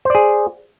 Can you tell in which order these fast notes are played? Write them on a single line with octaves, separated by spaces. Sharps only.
C5 D5 G#4